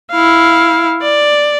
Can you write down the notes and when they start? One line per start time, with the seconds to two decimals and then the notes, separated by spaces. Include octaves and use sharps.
0.11 E4 F5
1.02 D5